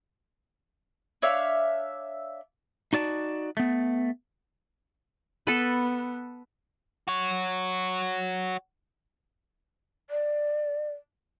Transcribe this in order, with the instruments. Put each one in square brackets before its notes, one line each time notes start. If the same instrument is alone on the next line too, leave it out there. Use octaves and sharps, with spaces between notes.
[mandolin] D4 C#5 E5 F5
[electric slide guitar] D#4 F#4 D5 A5
A3 B3
[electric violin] B3 [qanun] A4 B4
[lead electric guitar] F#4 C#5
[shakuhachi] D5